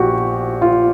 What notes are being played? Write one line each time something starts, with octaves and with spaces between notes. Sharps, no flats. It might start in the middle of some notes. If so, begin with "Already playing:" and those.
Already playing: A#1 A#2 F3 F#4 G4
F4